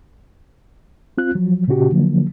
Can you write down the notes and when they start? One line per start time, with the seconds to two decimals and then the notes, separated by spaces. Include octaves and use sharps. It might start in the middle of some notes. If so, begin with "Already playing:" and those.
1.18 C4 F4 F#6
1.35 F3 F#3
1.68 A#2 C#3 C#4 F#4 G4
1.90 D3 F3 F#3 A#3